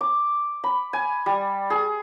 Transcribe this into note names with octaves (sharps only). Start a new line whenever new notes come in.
D6
B5
G#5
G3
G#4